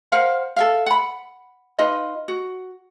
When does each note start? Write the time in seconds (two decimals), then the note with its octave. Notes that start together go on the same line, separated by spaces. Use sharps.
0.12 A#4 C5 F5 F#5
0.56 A4 E5 F5
0.86 F#5 B5
1.79 D#4 F4 B4 D#5
2.28 F#4